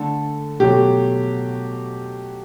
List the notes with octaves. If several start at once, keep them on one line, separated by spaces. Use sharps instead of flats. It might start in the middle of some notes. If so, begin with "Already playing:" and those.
Already playing: D3 A3 A4
B2 F#3 A3 G4